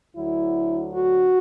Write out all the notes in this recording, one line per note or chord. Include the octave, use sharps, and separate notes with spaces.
D2 D3 F#3 E4
F#4